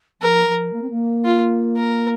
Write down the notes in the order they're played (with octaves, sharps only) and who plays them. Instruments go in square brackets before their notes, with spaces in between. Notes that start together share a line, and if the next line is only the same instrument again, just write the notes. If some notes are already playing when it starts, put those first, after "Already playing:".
[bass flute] F3 [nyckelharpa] A#4
[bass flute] F3
A#3
C4
A#3
[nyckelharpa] F4
A#4